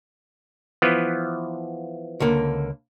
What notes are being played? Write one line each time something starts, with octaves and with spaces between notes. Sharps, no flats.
E3 F3 B3
C#2 D3 A#3